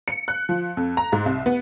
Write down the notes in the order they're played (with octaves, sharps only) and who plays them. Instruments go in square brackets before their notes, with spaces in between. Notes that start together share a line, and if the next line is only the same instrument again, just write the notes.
[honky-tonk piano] C#7
F#6
F3
F2
A#5
G#2
C2
B3